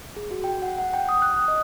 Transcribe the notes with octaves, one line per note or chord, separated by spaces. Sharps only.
G#4
F#4
G5
F#5
F#5
G5
D#6
F#6
D#6
D#5